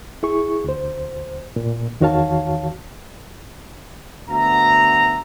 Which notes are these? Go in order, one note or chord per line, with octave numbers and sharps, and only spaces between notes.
E4 G#4 C#6
D2 C5
A#2
E2 D#3 F#4 C#5 F5 A5
D2 B3 F#4 E5 A#5